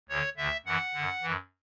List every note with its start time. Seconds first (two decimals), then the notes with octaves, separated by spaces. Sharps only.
0.09 D2 D3 C#5
0.37 D2 D3 E5
0.66 F#2 E3 F#5
0.94 F#2 D3
1.22 F#2 E3